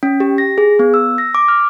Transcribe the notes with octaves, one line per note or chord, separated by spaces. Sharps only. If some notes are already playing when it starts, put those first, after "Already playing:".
C#4
G4
A#6
G#4
B3
E6
A#6
D6
F6